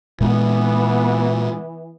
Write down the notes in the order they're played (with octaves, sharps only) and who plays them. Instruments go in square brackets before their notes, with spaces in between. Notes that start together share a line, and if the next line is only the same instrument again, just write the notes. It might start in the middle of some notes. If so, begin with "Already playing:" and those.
[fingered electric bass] A#2 G#3 [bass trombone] E3 [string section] B3